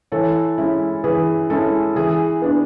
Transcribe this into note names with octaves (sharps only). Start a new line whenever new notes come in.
E3 A4 C#5
G#3 C#4 E4
E3 G#4 B4
G#3 C#4 E4 A4
E3 G#4
B3 D4